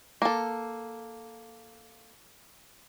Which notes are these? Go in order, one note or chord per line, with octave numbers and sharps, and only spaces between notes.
A#3 A4